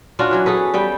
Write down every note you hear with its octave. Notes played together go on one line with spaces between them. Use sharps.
C#4 D4 F4 F#4
E3 F#3 C#5
B3 G#4 A4 B4
G3 B3 G5